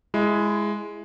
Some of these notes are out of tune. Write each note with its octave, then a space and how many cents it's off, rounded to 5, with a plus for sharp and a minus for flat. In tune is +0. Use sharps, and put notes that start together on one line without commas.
G#3 +0 E4 +15